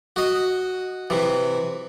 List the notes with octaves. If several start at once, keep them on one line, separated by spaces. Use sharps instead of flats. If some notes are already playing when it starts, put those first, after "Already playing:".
F#4 D#5
C3 E3